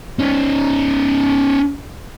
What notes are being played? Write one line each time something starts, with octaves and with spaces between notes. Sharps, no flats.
C#4 D#4